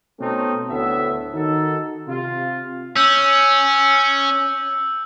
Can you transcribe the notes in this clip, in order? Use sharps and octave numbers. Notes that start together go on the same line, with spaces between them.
B2 A3 C4 C#4 D#4
D2 A2 B3 E5
D#3 D#4 F#4 A4
C3 F4
C#4 E6 G6